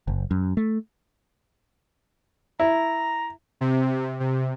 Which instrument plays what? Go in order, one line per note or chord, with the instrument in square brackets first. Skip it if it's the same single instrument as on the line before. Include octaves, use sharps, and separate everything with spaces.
[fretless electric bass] F#1
F#2
A3
[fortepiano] E4 [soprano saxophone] A#5
[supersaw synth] C3
C3